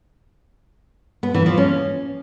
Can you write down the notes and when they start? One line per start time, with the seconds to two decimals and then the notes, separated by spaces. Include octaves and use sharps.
1.23 B3
1.34 E3
1.46 F3
1.58 C#4